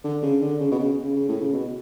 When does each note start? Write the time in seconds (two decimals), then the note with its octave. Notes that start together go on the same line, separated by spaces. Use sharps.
0.04 D3
0.23 C#3
0.41 D3
0.60 C#3
0.71 B2
0.79 C#3
1.03 C#3
1.16 C#3
1.29 A2
1.41 C#3
1.53 B2